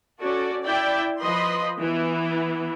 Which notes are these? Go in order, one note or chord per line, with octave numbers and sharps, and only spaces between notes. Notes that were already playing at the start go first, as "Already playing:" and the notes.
C#4 F#4 A4 D5
E4 D5 E5 G5
F3 B4 D#5 B5 C6
E3 B3